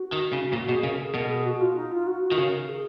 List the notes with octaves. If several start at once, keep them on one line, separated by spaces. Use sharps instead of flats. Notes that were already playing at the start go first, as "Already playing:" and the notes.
Already playing: F#4
D#3
C#3
A#2 F#4
B2 G#4
C#3 A#4
G#4
B2 A#4
G#4
F#4
F4
D#4
F4
F#4
F#4
D#3
C#3 A#4
G#4